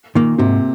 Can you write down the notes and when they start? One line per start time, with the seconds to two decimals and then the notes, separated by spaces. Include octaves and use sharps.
0.15 A#2 D#3 A#3
0.38 G#2 C3